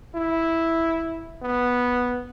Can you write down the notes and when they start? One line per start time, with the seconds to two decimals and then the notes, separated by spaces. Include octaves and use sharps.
0.16 E4
1.43 B3